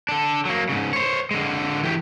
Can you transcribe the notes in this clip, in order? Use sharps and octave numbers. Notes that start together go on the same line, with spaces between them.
D4 A4
F#3 A#3
G#2 C#3
C5 C#5
D3 G#3
E3 G4